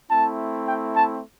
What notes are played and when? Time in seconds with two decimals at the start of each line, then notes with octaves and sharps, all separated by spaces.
0.10 A3 C4 E4 A5
0.66 G5
0.94 A5